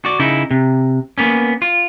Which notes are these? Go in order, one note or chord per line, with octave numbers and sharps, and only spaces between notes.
F#4 D5
C#3 D#4 E4
C3
A#3 B3 C#4
F4